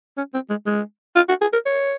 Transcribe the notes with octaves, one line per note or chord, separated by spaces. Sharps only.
C#4
C4
G#3
G#3
F4
F#4
G#4
A#4
C#5